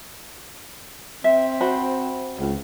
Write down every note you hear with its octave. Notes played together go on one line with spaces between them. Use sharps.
C4 E5
F#4 C5 B5
C#2